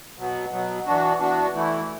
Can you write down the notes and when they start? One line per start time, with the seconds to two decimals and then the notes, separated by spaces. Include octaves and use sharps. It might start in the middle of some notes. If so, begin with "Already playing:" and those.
0.18 B2 F#3 B3
0.52 B2 F#3 B3
0.86 E3 B3 D4 F#4
1.20 E3 B3 D4 F#4
1.54 E3 A3 E4